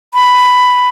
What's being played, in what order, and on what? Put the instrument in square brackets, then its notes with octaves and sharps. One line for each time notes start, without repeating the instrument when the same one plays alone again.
[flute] B5